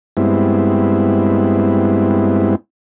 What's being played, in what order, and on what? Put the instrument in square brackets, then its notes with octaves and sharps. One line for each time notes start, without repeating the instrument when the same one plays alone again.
[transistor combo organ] G2 G#3 B3 C4 E4